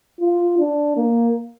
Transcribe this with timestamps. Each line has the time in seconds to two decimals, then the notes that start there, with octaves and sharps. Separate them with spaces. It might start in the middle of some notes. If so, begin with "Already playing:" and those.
0.21 F4
0.59 D4
0.97 A#3